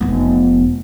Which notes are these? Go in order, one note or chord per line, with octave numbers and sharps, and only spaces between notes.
F1 B3